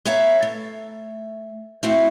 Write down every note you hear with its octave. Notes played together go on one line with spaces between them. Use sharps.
B3 C#5 E5 F5 A#5
A3
A3 C4 E4 F#4 F5 F#5